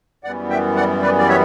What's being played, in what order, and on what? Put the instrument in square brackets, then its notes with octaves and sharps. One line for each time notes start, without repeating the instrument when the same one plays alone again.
[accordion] F#2 E3 G3 B3 D5 F#5
E5 G5
D5 F#5
B4 D5
D5
C#5 E5